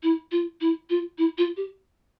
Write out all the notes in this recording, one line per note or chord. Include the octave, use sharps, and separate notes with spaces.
E4
F4
E4
F4
E4
F4
G4